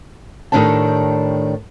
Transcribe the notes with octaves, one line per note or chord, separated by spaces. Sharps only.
A2 D#3 F3 D4 G4 A5